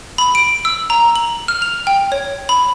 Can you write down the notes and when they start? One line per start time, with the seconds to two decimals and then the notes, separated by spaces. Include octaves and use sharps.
0.18 B5
0.35 D7
0.65 E6
0.90 A#5
1.16 F#7
1.48 F6
1.62 F7
1.87 G5
2.12 C#5
2.49 B5